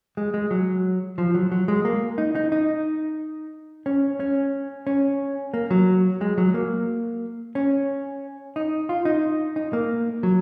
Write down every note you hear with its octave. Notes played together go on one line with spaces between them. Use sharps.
G#3
G#3
F#3
F3
F#3
F#3
G#3
A#3
D#4
D#4
D#4
C#4
C#4
C#4
A#3
F#3
G#3
F#3
A#3
C#4
D#4
F4
D#4
D#4
A#3
F#3